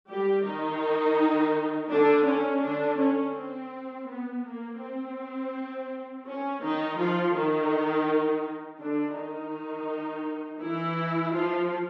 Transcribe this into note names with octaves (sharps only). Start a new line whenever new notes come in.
G3 G4
D#3 D#4
D3 D4
C#4
D3 D4
C#4
C4
B3
A#3
C4
C#4
D#3 D#4
F3 F4
D#3 D#4
D3 D4
D#3 D#4
E3 E4
F3 F4